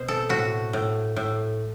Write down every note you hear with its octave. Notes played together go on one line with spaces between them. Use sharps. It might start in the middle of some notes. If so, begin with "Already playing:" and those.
Already playing: B2 C4 C5
A4
A2 F#4
A2
A2